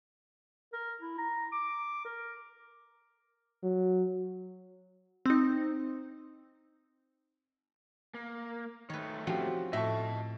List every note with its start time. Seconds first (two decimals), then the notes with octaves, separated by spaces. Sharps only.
0.73 A#4
1.01 E4
1.18 A#5
1.52 D6
2.05 A#4
3.63 F#3
5.26 C4 D#4
8.14 A#3
8.90 D#3 A3 B4 C#5
9.27 F3 C4 C#4 F#4 G4
9.73 A2 D#5 E5 A5 C#6